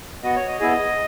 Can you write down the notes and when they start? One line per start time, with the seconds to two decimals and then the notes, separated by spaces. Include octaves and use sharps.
0.23 B3 F#4 D#5
0.36 C#5
0.47 D#5
0.60 B3 E4 G#4 D#5